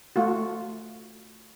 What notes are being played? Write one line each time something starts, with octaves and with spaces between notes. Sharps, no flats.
A3 F4 F#4